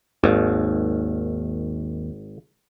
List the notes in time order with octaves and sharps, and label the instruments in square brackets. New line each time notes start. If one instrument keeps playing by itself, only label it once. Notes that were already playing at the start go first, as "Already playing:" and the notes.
[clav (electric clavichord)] G#1 [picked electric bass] D#2